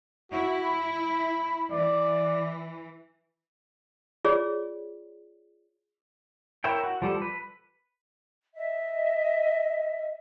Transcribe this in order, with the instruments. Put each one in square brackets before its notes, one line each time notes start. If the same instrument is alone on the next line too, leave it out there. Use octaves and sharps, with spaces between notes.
[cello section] E4 [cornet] F#4
[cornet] B5
[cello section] E3 [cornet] D5
[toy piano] F4 G#4 C#5 D5
[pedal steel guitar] E4 A#4 C#5 E5 G5
F#4
F3 G3 A4
B4
[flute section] D#5 E5